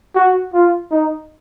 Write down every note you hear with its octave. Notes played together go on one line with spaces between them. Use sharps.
F#4
F4
D#4